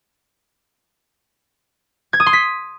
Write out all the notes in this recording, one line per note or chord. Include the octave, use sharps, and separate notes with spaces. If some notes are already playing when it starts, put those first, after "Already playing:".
G#6
D#6
C6
B6